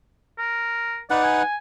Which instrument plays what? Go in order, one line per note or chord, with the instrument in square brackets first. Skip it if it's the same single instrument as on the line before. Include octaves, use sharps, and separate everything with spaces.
[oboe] A#4
[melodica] D#4 B4 F#5 [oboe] D5
[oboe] G#5